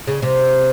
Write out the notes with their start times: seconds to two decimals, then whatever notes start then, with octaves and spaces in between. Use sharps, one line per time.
0.07 C#3
0.22 C3